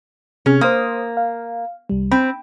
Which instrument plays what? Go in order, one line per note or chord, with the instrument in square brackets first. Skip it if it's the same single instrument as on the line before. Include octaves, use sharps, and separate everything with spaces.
[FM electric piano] C3 G#4 F6 [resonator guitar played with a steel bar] C#4
[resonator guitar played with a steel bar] A#3 [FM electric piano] C5 D#6
[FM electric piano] F5
C2 G3
[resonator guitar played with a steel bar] C4 [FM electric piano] B5